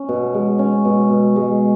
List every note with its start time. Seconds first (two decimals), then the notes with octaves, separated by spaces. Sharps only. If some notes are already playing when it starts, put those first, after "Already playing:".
Already playing: C#4
0.09 B2
0.34 G#3
0.59 C#4
0.85 B2
1.10 B2
1.36 G#3